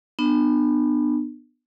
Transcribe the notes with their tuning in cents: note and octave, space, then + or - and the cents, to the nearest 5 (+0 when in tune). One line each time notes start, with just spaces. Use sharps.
B3 +0 D4 +40